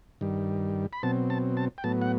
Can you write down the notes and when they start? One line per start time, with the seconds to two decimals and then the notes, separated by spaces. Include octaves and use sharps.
0.21 G2 D#3 G3
0.93 B5
1.03 B2 F#3 C4 A5
1.30 A5
1.57 A5
1.78 G5
1.84 A2 F#3 B3 A5
2.02 F#5